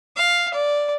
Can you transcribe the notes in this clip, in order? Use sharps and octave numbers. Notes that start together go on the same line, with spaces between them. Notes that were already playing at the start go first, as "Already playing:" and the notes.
F5
D5